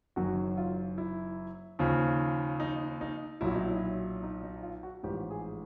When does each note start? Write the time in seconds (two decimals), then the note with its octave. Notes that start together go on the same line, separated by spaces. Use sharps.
0.16 F#1 F#2 D#3 F#3 F#4
0.58 F4
0.98 E4
1.79 D#2 C#3 F3
2.60 D#4
3.01 D#4
3.41 B1 A#2 F#3 E4
3.54 D#4
3.68 E4
4.23 D#4
4.43 D#4
4.63 F4
4.83 F#4
5.03 A1 G#2 F3 G4
5.30 G#4